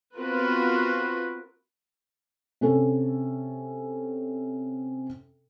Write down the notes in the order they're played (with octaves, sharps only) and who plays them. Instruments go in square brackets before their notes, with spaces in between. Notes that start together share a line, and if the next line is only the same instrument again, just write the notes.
[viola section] B3 C4 F4 F#4 A#4 B4
[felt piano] C3 C#4 A4